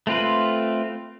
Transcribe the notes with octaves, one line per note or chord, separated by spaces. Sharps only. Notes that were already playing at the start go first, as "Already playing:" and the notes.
A3 C4 F4 B4